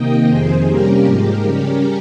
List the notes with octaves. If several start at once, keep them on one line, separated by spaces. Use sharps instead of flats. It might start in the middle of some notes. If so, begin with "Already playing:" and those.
Already playing: C3 D#3 A#3 D#4 D#5 G5
F2 C3 D#3 G#4 C5
C3 G3 A#3 C#4 G4 A#4
G#2 F3 G#3
C#3 G3 C#4